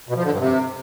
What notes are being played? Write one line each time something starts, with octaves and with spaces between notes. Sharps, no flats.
B2
F3
D3
G2
C3